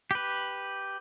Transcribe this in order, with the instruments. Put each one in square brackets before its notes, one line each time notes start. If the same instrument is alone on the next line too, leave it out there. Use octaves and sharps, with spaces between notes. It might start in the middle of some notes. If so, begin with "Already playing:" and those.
[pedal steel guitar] G4 B4